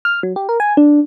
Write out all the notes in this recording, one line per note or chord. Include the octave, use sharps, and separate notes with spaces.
F6
F#3
G4
A#4
G#5
D4